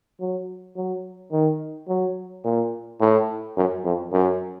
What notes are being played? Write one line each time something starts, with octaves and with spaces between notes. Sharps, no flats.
F#3
F#3
D#3
F#3
A#2
A2
F#2
F2
F#2